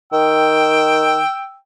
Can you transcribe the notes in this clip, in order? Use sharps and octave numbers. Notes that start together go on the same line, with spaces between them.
D#3 G5 E6